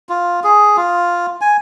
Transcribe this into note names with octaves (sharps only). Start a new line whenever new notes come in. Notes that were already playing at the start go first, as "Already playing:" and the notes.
F4
G#4
F4
G#5